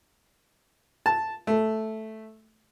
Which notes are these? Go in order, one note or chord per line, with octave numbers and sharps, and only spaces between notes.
A5
A3